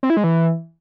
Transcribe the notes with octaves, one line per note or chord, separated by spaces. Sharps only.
C4
E4
G#3
E3